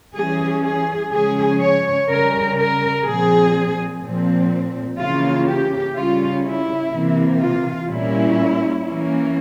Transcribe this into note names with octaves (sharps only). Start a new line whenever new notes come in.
E3 G3 C#4 G#4
G#4
C#3 F3 G#3 C#4 G#4
C#5
C#3 G3 C#4 A#4
A#4
A#2 F3 C4 G#4
A#2 F3 C4
C#3 E3 A#3 C#4 F4
G4
C#3 G3 C#4 F4
E4
C3 E3 A#3
F4
A#2 G3 A#3 C#4 E4
E3 A#3 C#4